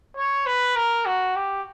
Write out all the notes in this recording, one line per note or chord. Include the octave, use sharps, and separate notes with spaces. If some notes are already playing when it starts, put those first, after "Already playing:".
C#5
B4
A#4
F#4
G4